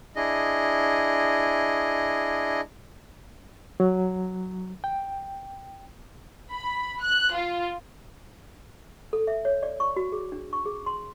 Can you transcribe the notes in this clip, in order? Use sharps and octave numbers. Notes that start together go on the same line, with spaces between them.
D4 E4 G#4 D#5
F#3
G5
B5
F#6
F4
A4
E5
C#5
D5
C#6
F#4
G#4
D4
C#6
G#4
C6